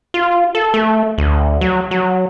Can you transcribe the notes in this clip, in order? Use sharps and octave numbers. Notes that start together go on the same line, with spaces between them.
F4
A4
A3
D2
F#3
F#3